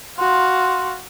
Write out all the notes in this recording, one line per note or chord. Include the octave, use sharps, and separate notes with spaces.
F#4 F5 C6